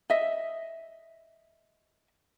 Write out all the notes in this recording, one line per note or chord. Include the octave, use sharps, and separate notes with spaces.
D#5 E5